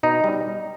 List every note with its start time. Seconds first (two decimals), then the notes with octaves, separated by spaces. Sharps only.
0.03 B2 D#4
0.24 G3